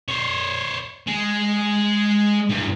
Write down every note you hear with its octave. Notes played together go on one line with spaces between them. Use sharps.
C5 C#5
G#3
G2 E3